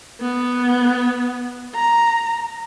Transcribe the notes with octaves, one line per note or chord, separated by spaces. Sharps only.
B3
A#5